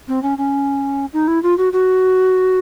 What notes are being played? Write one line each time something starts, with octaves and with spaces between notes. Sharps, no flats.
C4
C#4
C#4
D#4
E4
F4
F#4
F#4